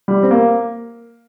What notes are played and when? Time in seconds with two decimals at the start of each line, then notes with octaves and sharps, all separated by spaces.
0.08 G3
0.23 C4
0.31 A#3